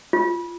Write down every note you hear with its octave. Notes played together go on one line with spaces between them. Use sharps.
F4